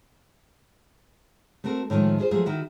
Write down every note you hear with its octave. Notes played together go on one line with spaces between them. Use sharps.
A3 C4 F#4 A#4
A2 D#3 F3 F#3 G#3
F4 G#4 B4 C5
F3 F#3 A3 G#4
D#3 E4 F#4